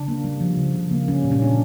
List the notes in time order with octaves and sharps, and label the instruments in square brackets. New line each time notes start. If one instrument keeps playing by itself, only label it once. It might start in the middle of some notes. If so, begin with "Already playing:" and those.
Already playing: [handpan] C#3 D4
A#3
G3
F3
C#3
C#3
A#3
G3 C#4
A#2
C#4
A#2 D4